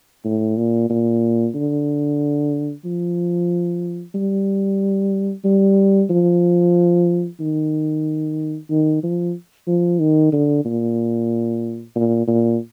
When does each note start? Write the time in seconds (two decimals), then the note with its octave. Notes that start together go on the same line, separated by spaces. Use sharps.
0.25 A2
0.57 A#2
0.90 A#2
1.55 D3
2.85 F3
4.15 G3
5.45 G3
6.10 F3
7.40 D#3
8.70 D#3
9.03 F3
9.67 F3
10.00 D#3
10.33 D3
10.65 A#2
11.95 A#2
12.27 A#2